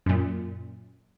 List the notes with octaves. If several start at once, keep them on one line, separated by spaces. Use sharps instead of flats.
F#2 A#2